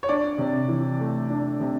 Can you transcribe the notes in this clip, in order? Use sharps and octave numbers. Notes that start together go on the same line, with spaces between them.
C#5
D4 D5
C3
E3
A3
D4
C3